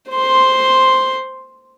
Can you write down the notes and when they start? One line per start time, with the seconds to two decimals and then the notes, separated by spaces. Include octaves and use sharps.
0.11 C5 C6